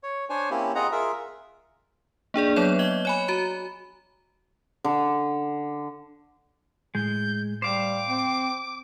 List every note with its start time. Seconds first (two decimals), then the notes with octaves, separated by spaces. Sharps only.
0.03 C#5
0.29 D4 C5 C#5 G#5
0.50 A#3 C4 C#4 E4 G4
0.75 C4 F4 G#4 D#5 F#5 A#5
0.92 F4 G#4 A#4 E5
2.34 A#3 D4 G#4 D5
2.56 F#3 B3 C#5 G6
2.79 D#5 G7
3.05 C#5 G#5 B5
3.28 F#4 A#5
4.84 D3
6.95 A2 G#3 G6
7.62 G3 C5 F5 G5 D6
8.08 C4